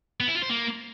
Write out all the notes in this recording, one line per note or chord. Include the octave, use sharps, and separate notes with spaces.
B3
E4
F4
C5
A#3